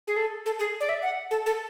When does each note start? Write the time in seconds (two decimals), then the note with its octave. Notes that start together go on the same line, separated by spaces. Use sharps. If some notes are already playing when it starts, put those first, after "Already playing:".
0.07 G#4
0.16 A4
0.46 A4
0.59 G#4
0.80 D5
0.89 E5
1.02 F#5
1.31 A4
1.46 A4